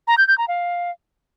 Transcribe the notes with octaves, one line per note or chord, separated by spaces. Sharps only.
A#5
G6
G6
A#5
F5